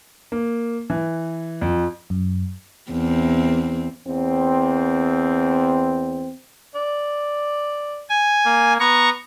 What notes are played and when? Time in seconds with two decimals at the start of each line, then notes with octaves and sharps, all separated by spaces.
0.32 A#3
0.90 E3
1.62 F2
2.10 F#2
2.91 E2 C4
4.06 E2 C4
6.75 D5
8.09 G#5
8.46 A#3
8.80 B3 A#5 C#6